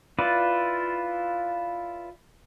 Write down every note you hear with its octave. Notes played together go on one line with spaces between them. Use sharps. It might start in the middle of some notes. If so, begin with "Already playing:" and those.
E4 F4 B4 D5